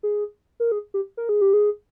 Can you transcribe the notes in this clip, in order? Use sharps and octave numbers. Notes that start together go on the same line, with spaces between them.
G#4
A#4
G#4
G4
A#4
G#4
G4
G#4